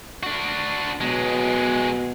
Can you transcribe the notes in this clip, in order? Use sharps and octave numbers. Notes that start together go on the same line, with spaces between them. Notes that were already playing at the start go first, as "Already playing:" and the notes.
D4 F#4
B2 F#3 G#3